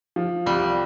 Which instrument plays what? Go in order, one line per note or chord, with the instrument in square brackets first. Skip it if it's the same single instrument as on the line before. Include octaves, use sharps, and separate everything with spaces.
[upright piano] F3
[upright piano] C2 [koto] G3